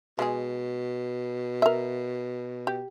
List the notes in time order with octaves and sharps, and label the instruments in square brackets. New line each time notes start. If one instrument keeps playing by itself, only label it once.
[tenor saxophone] B2 [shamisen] G#3 G#4
[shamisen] A#4 E5
G4